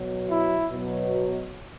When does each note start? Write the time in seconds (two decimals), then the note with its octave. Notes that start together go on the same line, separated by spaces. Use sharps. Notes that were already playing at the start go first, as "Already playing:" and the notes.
Already playing: B2 F#3
0.30 E4
0.72 B2 F#3